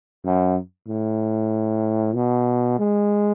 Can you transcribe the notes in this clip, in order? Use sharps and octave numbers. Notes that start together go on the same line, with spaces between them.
F#2
A2
B2
G#3